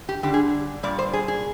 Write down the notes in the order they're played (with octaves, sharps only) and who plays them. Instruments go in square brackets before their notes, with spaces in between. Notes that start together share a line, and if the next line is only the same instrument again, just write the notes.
[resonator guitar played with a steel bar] G4
D3 G3 D4 G4
G#4
A#2 G3 D5
C5
G#4
G#4